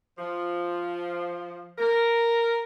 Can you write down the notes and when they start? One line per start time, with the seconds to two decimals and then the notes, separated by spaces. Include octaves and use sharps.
0.18 F3
1.79 A#4